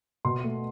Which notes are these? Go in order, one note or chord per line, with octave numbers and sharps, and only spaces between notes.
B2 C6
A3